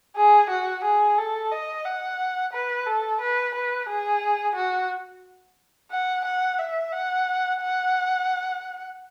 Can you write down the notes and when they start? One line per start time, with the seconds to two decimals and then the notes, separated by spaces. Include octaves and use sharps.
0.16 G#4
0.50 F#4
0.84 G#4
1.18 A4
1.51 D#5
1.85 F#5
2.53 B4
2.87 A4
3.21 B4
3.55 B4
3.89 G#4
4.55 F#4
5.91 F#5
6.25 F#5
6.58 E5
6.92 F#5
7.61 F#5